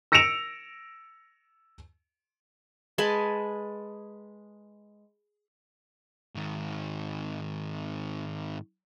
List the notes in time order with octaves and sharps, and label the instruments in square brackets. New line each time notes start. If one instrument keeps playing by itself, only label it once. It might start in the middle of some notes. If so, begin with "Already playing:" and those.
[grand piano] E6 A#6 C#7 D7 E7 F7
[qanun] G#3 B4 G#5 A5
[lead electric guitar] G#2 D#3